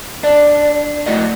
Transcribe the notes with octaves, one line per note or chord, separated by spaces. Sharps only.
D4 D5
A3 E4 F#4 D5 D#5